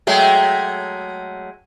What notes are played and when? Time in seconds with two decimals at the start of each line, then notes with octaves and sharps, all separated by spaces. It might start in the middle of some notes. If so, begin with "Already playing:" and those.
0.07 F#3 G#3 A3 G5